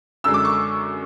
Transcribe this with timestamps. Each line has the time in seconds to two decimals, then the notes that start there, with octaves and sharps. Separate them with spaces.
0.24 F#2 D3 G#3 E6
0.34 D6
0.45 C#6